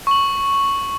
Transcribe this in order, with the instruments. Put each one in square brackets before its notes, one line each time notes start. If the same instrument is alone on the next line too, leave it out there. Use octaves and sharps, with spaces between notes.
[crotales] C#6 F#7